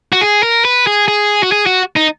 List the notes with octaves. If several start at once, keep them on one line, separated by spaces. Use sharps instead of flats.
F#4
G#4
A#4
B4
G#4
G#4
F#4
G#4
F#4
D#4